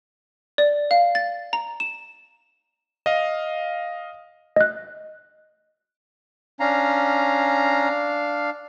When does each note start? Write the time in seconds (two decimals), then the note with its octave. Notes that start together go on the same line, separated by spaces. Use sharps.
0.58 D5
0.91 F5
1.15 A6
1.53 A#5
1.80 E7
3.06 D#5 F5
4.56 D#5 F#6
6.60 C#4 D4 F5 A#5